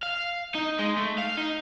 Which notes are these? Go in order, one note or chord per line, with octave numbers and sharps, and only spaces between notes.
F5
D#4
G#3
A3
F5
D#4